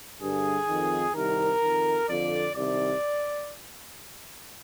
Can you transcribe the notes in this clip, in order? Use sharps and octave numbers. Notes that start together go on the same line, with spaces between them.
G2 D3 G#4
F2 D#3
C2 C3 D#3 A#4
F2 D#3
F2 D3 D5
C2 C3 D#3 D5